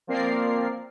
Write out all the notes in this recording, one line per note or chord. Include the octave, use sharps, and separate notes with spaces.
F3 A#3 C4 A#4 D5 C7